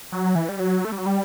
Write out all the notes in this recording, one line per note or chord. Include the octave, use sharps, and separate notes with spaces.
F#3
E3
G3
F#3
A3
G3
F#3
G3